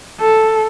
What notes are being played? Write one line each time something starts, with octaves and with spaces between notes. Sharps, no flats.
A4